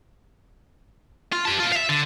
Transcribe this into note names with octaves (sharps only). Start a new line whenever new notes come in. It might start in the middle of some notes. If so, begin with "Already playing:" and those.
F4
G4 A5
B2 F4
E5 F5
D3